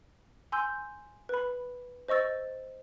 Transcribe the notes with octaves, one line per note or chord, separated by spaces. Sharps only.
G#5 C6 E6 G6
B4 B5
C5 D#5 C#6 E6 A6